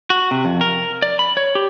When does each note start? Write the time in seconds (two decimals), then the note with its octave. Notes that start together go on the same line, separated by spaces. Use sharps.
0.10 F#4
0.31 C3
0.45 F2
0.61 A#4
1.02 D5
1.19 B5
1.37 C#5
1.55 G4